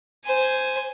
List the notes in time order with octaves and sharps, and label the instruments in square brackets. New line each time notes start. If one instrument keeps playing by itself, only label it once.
[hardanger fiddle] C5 G#5